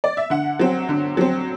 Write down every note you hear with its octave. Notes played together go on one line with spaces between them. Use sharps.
D5
E5
D3 F#5
F#3 C4
D3
F#3 C4